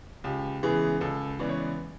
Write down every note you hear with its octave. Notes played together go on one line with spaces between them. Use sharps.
C#2 G4
C#3 E3 G#3 B3 G#4
C#2 A4
C#3 E3 G#3 B3 D5
C#5
D5